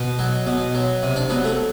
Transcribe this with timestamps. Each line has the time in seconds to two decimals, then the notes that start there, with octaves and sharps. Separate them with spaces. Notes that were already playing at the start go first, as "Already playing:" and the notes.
Already playing: B2
0.19 F#3
0.46 B2
0.75 F#3
1.03 C3
1.16 D4
1.30 F#3 B3
1.44 A3